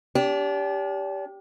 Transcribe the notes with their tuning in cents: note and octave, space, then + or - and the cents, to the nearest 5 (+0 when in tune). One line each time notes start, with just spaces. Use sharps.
D4 -40 G4 +0